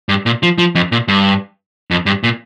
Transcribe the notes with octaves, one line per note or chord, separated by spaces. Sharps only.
G2
A#2
F3
F3
F2
A#2
G2
F2
G2
A#2